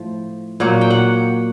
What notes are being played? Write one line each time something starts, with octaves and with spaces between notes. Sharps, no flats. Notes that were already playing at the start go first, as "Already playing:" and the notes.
Already playing: A2 F3
A#2 F#3 A#3 F#5
G5
F#5